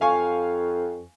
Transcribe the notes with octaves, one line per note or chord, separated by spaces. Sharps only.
F2 F5 G#5 C#6